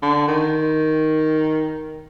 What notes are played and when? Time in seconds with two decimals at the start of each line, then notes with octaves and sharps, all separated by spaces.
0.02 D3
0.28 D#3